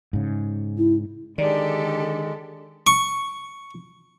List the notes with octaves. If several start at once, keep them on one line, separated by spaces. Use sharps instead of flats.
G#2 C#3
E4
D3 D#3 G#3 G4 A4 D5
C#6